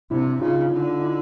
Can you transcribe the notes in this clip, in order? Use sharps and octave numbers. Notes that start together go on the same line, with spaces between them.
C3 D4 E4
D4 E4
C#3 D#4 F4
D3
D#4
D4 E4